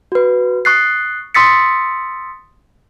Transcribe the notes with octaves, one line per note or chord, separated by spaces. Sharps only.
F#4 B4
C#6 D#6 F#6 A6 C7
C6 D#6 E6 A6 B6 C#7